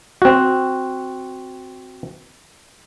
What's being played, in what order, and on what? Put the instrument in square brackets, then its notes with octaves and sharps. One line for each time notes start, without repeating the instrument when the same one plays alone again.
[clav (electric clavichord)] C4 F#4